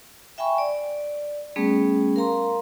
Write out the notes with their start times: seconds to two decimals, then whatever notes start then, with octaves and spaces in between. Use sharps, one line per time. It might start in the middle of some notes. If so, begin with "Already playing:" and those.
0.38 E5 G5 G#5 B5 C#6
0.58 D5
1.56 G3 A3 B3 C#4 G#4
2.16 A#4 F5 A#5 C6